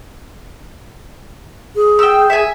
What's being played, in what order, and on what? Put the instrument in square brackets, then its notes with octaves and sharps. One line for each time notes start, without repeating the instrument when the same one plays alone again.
[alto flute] G#4
[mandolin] G5 E6
E5 G#5